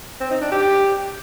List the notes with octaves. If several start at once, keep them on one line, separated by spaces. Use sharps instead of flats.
C4
D#4
D4
G4